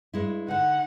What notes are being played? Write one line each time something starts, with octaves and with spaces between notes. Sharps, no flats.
G2 G#3 E4
D3 D#4 F#5